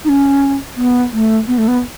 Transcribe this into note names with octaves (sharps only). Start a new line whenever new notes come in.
D#4
C#4
B3
A3
B3
A3
B3